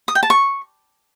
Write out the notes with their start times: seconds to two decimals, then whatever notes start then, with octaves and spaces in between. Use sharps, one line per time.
0.08 D#6
0.15 G5
0.23 A5
0.30 C#6